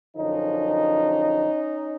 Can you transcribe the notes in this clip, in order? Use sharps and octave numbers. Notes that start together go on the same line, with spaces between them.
F#2 D3 F3 C#4 D#4